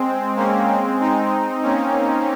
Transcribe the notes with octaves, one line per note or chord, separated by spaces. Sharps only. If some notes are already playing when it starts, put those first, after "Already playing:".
Already playing: G#3 C4
A#3 C#4
G#3 C4
C4 D#4
A#3 C#4